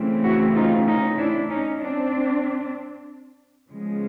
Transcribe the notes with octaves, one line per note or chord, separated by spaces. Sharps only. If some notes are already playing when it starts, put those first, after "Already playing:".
Already playing: C#3 E3 A3 C4
E4 F#4
D#4 F4
C#4 D#4
D4 E4
C#4 D#4
C4 D4
C#3 F3 G#3 B3